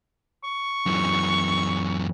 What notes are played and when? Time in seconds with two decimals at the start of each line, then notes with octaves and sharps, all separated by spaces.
0.44 C#6
0.86 F#2 E3